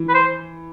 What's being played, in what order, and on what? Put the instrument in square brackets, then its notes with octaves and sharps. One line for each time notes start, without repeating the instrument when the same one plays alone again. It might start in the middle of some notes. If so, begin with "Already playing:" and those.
Already playing: [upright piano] E3
[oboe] B4
C5